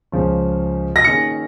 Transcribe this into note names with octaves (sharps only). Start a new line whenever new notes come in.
C#2 C#3 F3 C#4
A#6
D#3 A#3 C#4 G#4 C#7